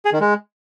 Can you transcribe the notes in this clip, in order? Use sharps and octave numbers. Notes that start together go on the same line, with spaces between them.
G#4
D#3
G#3